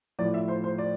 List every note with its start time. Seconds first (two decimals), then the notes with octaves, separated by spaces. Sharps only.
0.19 A2 F3 D5
0.34 E5
0.48 C5
0.64 C5
0.78 D5